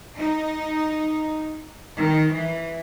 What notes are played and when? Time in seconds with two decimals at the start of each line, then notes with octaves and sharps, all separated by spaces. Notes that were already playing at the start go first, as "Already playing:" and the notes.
0.17 D#4
1.97 D#3
2.32 E3